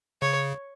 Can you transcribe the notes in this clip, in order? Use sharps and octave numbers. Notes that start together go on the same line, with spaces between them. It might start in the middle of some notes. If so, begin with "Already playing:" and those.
C#3 C#5